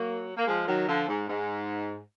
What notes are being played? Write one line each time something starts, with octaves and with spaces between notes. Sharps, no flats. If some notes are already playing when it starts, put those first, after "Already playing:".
Already playing: F#3 A#3
A#3
F3 G#3
D#3 F#3
D3 F3
G#2
G#2